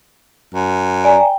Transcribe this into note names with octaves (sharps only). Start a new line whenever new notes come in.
F#2
D5 G#5 A#5
G5